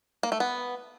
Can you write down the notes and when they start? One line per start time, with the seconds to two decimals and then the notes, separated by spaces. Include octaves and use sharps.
0.23 A#3
0.32 A3
0.40 B3